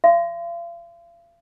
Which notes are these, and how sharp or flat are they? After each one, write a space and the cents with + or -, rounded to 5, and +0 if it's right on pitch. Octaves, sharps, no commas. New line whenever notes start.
F5 -40 C6 -30